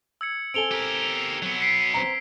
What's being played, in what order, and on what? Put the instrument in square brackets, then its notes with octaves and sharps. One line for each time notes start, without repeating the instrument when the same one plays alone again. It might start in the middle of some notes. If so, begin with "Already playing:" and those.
[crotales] E6 G#6 C#7
[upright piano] C4 A4 G#5 [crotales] D7 F7 G7
[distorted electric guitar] G4 A#4
F#3 B3
[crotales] B6 C7 D7
[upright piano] C4 A#5